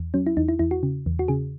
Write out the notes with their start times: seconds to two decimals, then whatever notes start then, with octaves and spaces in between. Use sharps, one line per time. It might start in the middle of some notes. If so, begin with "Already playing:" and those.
Already playing: E2
0.14 F#3 C#4
0.26 E4
0.37 E2 D#4
0.48 E4
0.59 E2 E4
0.71 F#4
0.83 C#3
1.06 E2
1.19 F#4
1.28 C#3 G#4